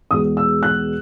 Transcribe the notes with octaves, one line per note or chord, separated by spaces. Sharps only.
E2 B2 G#3 D#6
E6
F#6